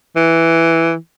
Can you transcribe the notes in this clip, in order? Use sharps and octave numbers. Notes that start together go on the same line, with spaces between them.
E3